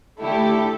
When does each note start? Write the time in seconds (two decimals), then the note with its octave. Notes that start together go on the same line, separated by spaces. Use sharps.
0.19 D3 A3 E4 G4 A4